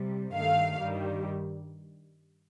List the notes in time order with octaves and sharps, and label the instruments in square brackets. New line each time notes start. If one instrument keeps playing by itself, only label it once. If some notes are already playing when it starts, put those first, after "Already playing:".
Already playing: [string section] C3 G3
G2 D#3 A3 F5
G2 D#3 G3